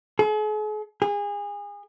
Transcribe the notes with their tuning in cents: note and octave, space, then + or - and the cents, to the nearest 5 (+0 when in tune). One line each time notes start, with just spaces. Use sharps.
G#4 +45
G#4 -30